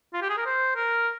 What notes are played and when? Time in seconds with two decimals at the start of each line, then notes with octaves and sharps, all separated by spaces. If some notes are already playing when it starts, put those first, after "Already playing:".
0.13 F4
0.22 G4
0.29 G#4
0.38 A#4
0.46 C5
0.76 A#4